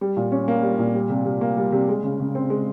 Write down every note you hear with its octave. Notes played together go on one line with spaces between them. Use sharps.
G3
A#2
C#4
A#3
G3
A#2
G3
C3
C3
A#3
G3
C3
G#3
C#3
C#3
C4
G#3